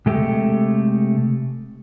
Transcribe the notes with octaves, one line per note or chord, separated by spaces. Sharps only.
C3 G#3 A3 G4 A4